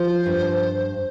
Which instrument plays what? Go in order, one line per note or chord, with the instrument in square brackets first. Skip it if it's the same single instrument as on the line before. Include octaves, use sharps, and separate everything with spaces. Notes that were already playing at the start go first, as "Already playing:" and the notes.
Already playing: [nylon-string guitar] F3 [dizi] C5
[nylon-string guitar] G2